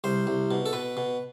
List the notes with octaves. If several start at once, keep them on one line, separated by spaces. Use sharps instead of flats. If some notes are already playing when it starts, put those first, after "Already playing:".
C2 C5
C2
B2
A4
B2 B4
B2